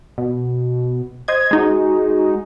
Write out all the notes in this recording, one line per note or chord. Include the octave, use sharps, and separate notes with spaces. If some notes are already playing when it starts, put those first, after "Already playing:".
B2
C5 D#5 G#6
G#3 D#4 F#4